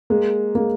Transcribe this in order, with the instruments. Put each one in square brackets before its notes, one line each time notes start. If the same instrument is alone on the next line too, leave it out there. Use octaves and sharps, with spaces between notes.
[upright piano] G#3 A#3
G#3 A#3